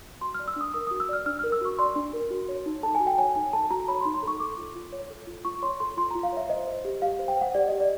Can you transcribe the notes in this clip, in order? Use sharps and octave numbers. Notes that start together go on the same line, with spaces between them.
F#4 C6
D5 F6
E6
D4 D#6
A#4 D#6
F#4 D#6
E6
D5 F6
D4 F6
A#4 F6
E6
F#4 C#6
D5 C6
D4
A#4
F#4
C#5
D#4
A4 A5
G#5
F#4
G5
C#5 G#5
D#4 G#5
A4 A5
F#4 A#5
C#5 B5
D#4 C6
C6
A4 C#6
A4 D6
F4
F4
C#5
A4
F4
F4 C#6
C#5 C6
A4 C6
F4 C6
F4 A#5
F5
C#5 E5
C5 D#5
C5
G4
G4 F5
C5
G5
C5 F#5
G4 D5
G4 D#5
D5